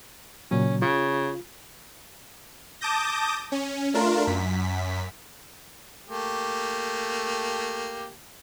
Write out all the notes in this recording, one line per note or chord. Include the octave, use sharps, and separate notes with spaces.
A#2 C#3 F#3 C#4
C#3 F4
A5 D6 D#6 G6 A#6
C#4
A3 D4 F4 A#4
F#2 B6
A3 A#3 G4